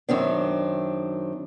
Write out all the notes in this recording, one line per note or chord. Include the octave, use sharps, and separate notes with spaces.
F#2 D#3 C4 D4